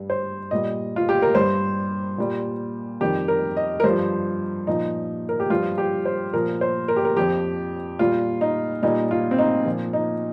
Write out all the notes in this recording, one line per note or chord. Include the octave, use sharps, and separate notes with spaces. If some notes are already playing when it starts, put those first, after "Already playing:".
Already playing: G2 G3
C5
A#2 G3 D#5
F4
G4
A#4
G2 G3 C5
A#2 G3
F2 D#3 G3 G4
A#4
D#5
A#4
G2 F3 C5
A#2 F3 D#4
A#4
G4
G2 F3 F4
G4
C5
A#2 F3 A#4
C5
A#4
G4
A#4
F2 F3 G4
A#2 G3 F4
D#4
A#2 G3 D#4
F4
C4
D#4
A#2 F3
D#4